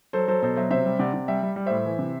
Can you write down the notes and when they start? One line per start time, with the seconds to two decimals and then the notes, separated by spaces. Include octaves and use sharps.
0.13 F#3 A4 C5
0.28 F#3 A4 C5
0.42 B2 A4 C5
0.56 F#3 C5 E5
0.71 C3 C5 E5
0.86 G3
0.99 C3 D5 F#5
1.14 C3
1.28 G3 E5 G5
1.43 G3
1.56 G3
1.66 A2 C5 E5
1.86 E3
1.99 C3